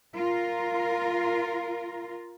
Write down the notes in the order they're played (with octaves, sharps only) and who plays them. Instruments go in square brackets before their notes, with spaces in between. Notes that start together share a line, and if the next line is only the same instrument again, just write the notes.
[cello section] F4 A#4